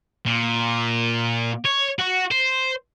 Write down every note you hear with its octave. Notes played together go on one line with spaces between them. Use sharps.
A#2
C#5
F#4
C5